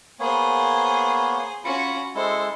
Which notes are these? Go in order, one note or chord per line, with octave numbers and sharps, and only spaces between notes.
A#3 B3 G#4 C5 C#5
C#4 F4 F#4 B5
G#3 E4 A4 C5